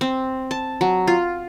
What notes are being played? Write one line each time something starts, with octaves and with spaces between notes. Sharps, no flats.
C4
A5
F#3
F4